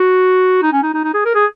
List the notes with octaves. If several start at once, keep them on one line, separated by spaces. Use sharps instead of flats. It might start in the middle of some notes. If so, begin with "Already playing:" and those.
Already playing: F#4
D#4
C#4
D#4
D#4
D#4
G#4
A#4
G#4